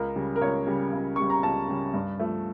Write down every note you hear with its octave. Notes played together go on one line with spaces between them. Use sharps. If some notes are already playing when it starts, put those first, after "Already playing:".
Already playing: C#2 A#4
C#3 G3
A#4
C#2 C#5
C#3 G3
C#2
C#3 G3 C#6
A#5
C#2 A5
C#3 G3
G2
F3 A3